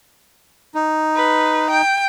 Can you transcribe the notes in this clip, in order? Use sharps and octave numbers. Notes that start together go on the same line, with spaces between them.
D#4
B4
G5